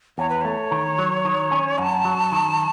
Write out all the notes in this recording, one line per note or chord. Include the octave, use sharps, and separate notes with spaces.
E2 C#5
B4
A3 C#5
D#3
F#3
D#3
C#4
F#2 A5
F#3
D#3